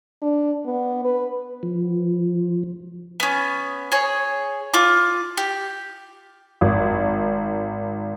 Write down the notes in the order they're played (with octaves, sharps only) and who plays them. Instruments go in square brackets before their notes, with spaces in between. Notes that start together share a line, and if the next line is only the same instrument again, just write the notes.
[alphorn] D4
B3
B4
[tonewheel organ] F3
[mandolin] B3 C#4
G#4 C#5
F4 D6
G4
[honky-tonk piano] G#1